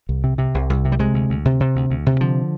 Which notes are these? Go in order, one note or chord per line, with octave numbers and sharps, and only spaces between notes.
C2
C3
C3
C2
C2
C3
G3
C3 G#3
D2
D2
C3
C3
D2
D2
C3
D3 F3